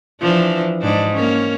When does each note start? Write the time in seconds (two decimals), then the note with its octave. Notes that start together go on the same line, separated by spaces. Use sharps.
0.21 E3 F3 D4
0.82 G#2 D4
1.15 A#3 C#4